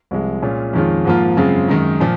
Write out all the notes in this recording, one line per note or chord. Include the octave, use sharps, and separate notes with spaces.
C2 C3 F3 G#3
A#2 G#3 C#4 F4
F2 D#3 G#3 C#4 F4
G#2 F3 A#3 F4
F#2 C#3 G#3 C4 F4
F#2 D#3 G#3 D#4
A#2 F3